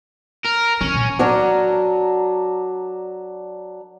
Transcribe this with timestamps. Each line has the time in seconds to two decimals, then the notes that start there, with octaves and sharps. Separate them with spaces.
0.45 A#4
0.81 E3 C#4
0.95 A#2
1.19 F#3 D4 A#4